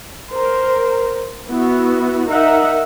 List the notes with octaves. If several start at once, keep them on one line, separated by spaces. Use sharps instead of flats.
A#4 C5
B3 E4 F#4
D#4 A#4 E5 F#5